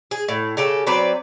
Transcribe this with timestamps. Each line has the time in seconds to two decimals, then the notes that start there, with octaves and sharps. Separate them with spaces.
0.11 G#4
0.28 A2
0.57 C#3 G4 A4
0.87 F#3 C4 B4 D5